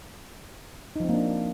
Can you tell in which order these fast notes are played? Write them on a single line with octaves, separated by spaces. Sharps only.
D#4 F3 C4 A#3 D4